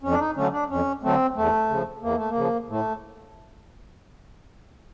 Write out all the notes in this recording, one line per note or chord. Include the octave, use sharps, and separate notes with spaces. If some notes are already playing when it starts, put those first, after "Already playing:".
F2 C#4
D4
D#4
D3 F#3 A3 C#4
D4
F2 C#4
D3 F#3 A3 C4
E2 A3
C#3 F3
E2 A#3
A3
A#3
C#3 F3
A2 A3